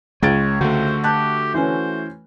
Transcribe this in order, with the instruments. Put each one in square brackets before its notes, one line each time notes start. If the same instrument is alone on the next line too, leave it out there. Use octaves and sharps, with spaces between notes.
[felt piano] C#2 A6 D7 [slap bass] G#3 [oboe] C#5
[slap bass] D3 [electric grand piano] A3 F#4 [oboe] C5
[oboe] G4 [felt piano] A5 F#6
[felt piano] E3 C#4 [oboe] C5